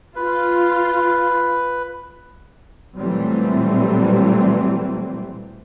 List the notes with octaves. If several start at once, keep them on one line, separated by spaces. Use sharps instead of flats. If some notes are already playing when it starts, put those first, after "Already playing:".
F4 B4
A#2 E3 F#3 G3 A3 C4